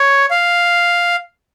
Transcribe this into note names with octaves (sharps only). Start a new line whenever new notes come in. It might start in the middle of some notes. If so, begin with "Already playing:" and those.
Already playing: C#5
F5